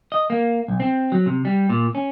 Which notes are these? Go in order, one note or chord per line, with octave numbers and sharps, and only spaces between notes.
D#5
A#3
B1
C4
F#3
C3
G3
A#2
C#4